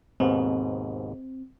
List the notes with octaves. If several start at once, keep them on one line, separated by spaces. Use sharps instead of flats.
D#2 G#2 B2 C4